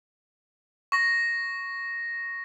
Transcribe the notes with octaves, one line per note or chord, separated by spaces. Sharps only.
C#6 A#6